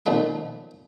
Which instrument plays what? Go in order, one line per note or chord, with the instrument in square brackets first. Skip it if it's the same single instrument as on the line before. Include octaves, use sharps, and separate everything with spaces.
[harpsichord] B1 A#2 D#3 F3 A3 C6